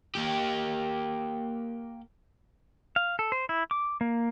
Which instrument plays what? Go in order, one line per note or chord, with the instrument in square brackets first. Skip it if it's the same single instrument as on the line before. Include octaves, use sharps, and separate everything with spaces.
[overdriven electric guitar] A#3 G4
[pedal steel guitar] F5
A4
C5
E4
D6
A#3